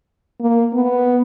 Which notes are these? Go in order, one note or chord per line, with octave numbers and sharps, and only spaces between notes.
A#3
B3